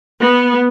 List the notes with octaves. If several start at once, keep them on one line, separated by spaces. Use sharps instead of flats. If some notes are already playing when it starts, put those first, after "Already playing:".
B3